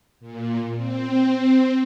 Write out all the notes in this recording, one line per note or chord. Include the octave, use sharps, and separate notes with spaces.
A#2
C4